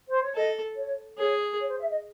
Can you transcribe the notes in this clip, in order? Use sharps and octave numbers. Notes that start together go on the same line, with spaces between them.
C5
C#5
A4 D#5
C#5
G#4 C#5
C#5
C5
E5
D#5